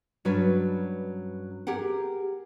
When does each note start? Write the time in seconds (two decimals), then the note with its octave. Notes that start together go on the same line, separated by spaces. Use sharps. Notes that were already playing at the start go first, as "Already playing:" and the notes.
0.25 G2 F#3 C#4 D4 B4
1.67 G4 G#4 A#4 F#5